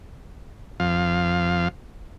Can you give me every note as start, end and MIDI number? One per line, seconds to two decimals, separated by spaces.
0.80 1.68 41
0.80 1.68 77